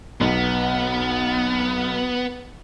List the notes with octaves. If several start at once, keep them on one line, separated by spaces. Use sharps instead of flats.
B1 B3